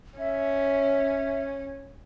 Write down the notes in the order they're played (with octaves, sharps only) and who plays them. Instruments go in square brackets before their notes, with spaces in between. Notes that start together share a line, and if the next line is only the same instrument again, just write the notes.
[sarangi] C#4 [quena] E5